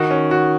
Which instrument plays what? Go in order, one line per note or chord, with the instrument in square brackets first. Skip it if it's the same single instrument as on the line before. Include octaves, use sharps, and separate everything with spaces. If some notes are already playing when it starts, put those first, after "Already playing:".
Already playing: [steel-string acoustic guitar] D#3 [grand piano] F#4
[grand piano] C#4
F#4